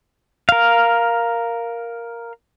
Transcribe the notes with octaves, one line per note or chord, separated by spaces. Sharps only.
A#4 F5